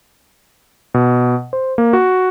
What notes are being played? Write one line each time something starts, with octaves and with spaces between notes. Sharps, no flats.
B2
C5
A#3
F#4